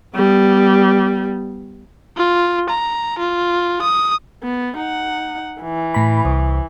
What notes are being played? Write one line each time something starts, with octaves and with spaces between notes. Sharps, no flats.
G3 B3
F4
A#5
F4
D#6
B3
D#4 F#5
E3
A2 B5
C2